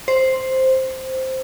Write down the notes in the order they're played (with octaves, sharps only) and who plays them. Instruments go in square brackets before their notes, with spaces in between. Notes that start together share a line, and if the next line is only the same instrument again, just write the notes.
[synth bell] C5